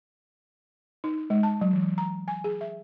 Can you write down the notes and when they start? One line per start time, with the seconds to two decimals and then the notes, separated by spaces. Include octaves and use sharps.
1.04 D#4
1.30 G#3
1.43 A5
1.61 F#3
1.73 E3
1.98 A#5
2.28 G#5
2.44 G#4
2.61 E5